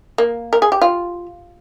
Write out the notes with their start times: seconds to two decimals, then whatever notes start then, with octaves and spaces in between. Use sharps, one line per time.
0.18 A#3
0.53 A#4
0.62 G#4
0.72 G4
0.82 F4